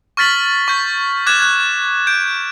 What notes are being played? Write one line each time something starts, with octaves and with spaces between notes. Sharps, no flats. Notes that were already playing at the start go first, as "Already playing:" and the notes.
C#6 F6 A6 B6 F#7
C#6 G6 B6
D6 F#6 G#6 B6 E7
F#6 G#6
G6 D7